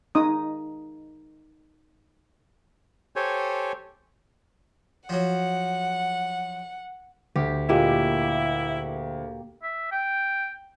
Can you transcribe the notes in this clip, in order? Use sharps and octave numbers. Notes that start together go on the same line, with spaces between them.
D#4 D#6
G4 A4 C5 C#5 G#5
F3 F#3 F#5
D2 G4
A#2 G#3 A#3 E4 G4 B5
E5
G5